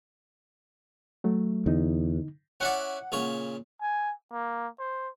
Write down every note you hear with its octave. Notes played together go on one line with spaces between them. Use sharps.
F#3 A3
E2 D3 D#4
C#4 E4 D5 F#5
A#2 C#3 C#5
G#5
A#3
C5